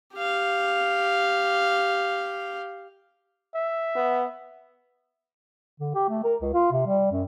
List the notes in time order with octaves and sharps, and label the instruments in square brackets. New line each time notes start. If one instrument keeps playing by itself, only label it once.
[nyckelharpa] G4 F5
[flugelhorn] E5
[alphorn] B3
[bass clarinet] D3
G4
A3
A#4
C#2
F4
C3
G3
F#2